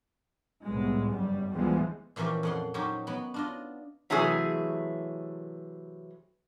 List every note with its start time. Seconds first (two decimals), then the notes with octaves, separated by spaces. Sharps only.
0.65 C2 A2 G#3 B3
1.10 F#1 G2 G3
1.51 D2 E3 F3 G3 G#3 B3
2.16 A#2 E3 F3 A#3 C#4 G4
2.43 F2 F#5 C6
2.74 F#3 C#4 D#4 G4 C5
3.07 F#3 B3
3.34 D4 F4 D#5
4.10 C3 E3 F#3 A3 G#4